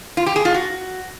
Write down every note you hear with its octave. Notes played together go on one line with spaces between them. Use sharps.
F4
G4
G#4
F4
F#4